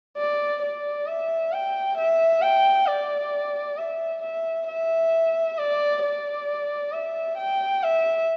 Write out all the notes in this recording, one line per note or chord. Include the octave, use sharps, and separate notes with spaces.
D5
D5
E5
G5
E5
G5
D5
E5
E5
E5
D5
D5
E5
G5
E5